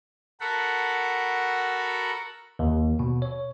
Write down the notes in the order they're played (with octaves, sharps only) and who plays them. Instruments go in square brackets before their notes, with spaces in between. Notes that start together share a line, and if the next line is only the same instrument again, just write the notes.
[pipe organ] F#4 A4 A#4 F#5 B5
[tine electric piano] D#2
B2
C#5